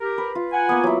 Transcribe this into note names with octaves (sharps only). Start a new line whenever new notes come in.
G4 A#4
B4
F4
F#5 G#5
A#3 B3
F#3 E4